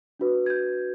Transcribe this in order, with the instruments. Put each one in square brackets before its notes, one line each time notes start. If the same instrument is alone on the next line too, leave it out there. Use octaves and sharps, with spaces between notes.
[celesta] D4 F#4 B4
G#6
G6